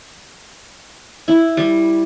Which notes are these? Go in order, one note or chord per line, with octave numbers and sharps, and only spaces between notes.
E4
G3